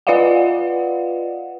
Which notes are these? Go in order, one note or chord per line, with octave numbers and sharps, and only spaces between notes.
F4 B4 D5 D#5 F5 F#5